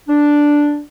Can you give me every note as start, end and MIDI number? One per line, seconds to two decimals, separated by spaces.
0.08 0.81 62